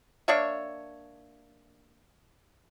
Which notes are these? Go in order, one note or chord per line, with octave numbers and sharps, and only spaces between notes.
A#3 D4 C#5 E5